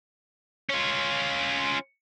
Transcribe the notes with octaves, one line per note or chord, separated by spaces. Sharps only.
C#4 F4